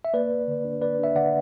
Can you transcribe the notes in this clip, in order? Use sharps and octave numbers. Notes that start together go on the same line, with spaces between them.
E5
A#3 B4 D5
A#3
D3
D4
A#3 B4 D5
D4 E5
D3 D5 F#5